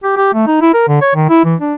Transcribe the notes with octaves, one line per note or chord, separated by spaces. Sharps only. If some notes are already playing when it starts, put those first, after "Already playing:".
G4
G4
A3
D#4
E4
A#4
D3
C#5
D#3
E4
E3
D4